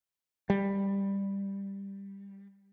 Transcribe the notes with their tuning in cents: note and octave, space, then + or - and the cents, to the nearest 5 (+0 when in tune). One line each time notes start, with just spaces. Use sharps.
G3 +10